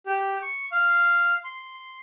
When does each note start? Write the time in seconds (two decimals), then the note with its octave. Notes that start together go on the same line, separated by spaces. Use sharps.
0.06 G4
0.42 C#6
0.72 F5
1.44 C6